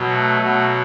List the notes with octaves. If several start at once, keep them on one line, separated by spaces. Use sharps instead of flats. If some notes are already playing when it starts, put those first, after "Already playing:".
Already playing: B2 F#3
A3
B2 F#3